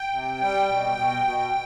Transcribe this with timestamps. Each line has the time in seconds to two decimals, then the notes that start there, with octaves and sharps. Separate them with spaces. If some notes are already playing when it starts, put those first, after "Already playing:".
Already playing: G5
0.12 C3
0.41 G3
0.68 B2
0.97 B2
1.24 B2